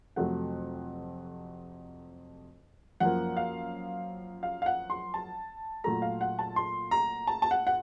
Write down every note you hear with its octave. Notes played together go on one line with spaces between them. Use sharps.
F2 C3 F#3 A3 F#5
F#2 F3 A#3 F#5
F5
F5
F5
F#5
C6
A5
A#2 F#3 A3 A#5
F5
F#5
A5
C6
A#5
A5
A5
F#5
F#5